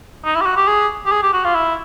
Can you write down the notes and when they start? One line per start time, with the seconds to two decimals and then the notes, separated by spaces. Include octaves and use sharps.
0.24 D#4
0.35 E4
0.41 G4
0.46 F#4
0.57 G4
0.68 G#4
1.06 G4
1.12 G#4
1.23 G4
1.33 F#4
1.45 F4
1.55 E4